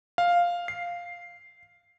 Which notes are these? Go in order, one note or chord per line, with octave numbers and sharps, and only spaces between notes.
F5
C7